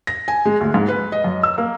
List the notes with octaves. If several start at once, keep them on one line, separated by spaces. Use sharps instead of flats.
A#6
G#5
G#3
D2
G#2
B4
D#5
F#2
E6
A#3